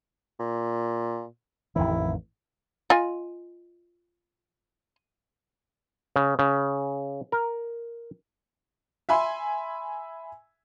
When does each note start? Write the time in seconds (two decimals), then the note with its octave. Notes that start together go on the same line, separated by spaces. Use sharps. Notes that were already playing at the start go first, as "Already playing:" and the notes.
0.40 A#2
1.76 A1 F2 D#3 E4
2.90 F4 D#5 G#5
6.16 C#3
6.39 C#3
7.32 A#4
9.09 E5 G#5 B5 C6